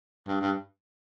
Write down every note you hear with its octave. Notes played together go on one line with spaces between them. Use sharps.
G2
G2